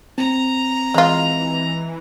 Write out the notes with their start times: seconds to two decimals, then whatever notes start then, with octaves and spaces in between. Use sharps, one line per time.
0.18 C4 A#5
0.94 E3 G#3 F4